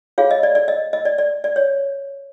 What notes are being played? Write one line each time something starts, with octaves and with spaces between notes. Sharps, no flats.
F4 G#4 C#5 F5
D#5
D5
D5
D#5
D#5
D5
D5
D5
C#5